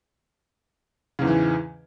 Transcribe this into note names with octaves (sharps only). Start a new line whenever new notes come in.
E2 G#2 C#3 E3